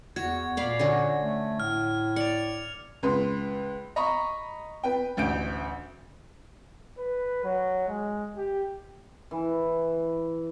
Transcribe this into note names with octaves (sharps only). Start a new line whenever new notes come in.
E2 F#4 G#6
A#2 D5 F5 B5
D3 C#4 F#4
A3
A2 F6
D5 C#7 F7
C#2 B4 C6
D#5 A#5 B5 C#6
B4 G5
A1 D2 G6 D7
B4
F#3
G#3
G4
E3